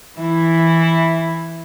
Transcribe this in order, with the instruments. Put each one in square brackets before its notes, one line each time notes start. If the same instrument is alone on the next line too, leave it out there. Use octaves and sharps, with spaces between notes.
[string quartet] E3 E4